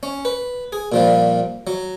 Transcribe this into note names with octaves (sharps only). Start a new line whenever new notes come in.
C#4
B4
G#4
A#2 F3 G3
F#3